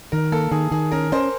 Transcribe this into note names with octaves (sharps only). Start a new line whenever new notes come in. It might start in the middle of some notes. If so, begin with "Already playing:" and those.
D#3 A#4
A#3 A4
D#3 G#4
D#3 G#4
C#4 A#4
C#4 C5